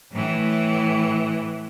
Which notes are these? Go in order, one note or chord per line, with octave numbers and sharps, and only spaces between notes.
A2 E3